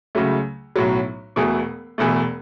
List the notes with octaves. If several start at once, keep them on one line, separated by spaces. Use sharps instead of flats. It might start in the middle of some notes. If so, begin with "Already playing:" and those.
C#2 C#3 F#3 A3
B1 A2 F#3
E1 E2 B2 A3
E1 E2 B2 A3